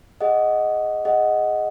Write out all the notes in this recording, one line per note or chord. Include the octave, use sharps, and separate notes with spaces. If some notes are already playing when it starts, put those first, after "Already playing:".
G#4 D#5 F#5
G#4 D#5 F#5